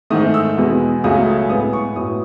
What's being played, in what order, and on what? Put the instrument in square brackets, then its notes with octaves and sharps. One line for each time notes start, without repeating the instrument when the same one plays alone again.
[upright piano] G#2 D#3 A3 D#6
E6
E2 B2 G#3 B3
C#2 C#3 F#3 A3 D#6
A2 G#3 B3 D#6
C#6
A2 F#3 B3 D#6